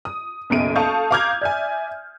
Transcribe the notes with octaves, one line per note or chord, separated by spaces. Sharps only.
D#6
F#1 B1 B2 D7 D#7
A4 F5 A5 C#6 D#6 G6
F5 A#5 D6 F6 G6 G#6
D5 E5 G#5